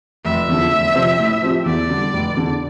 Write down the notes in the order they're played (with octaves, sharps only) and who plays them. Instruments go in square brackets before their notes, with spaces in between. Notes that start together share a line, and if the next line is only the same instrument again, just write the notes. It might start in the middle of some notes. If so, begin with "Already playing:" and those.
[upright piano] F1 [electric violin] E5
[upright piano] E2 D3 F3
F1
F2 C3 F3 C4
A2
F3 C4 G4
[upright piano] E2 [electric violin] D5
[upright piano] D3 G3 D4
F1
E2 D3